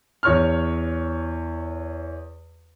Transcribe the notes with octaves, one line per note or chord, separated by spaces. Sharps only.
E2 C#5 F6